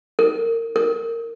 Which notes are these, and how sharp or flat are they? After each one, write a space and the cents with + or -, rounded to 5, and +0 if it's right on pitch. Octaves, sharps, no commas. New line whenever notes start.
A#4 -25
A#4 -15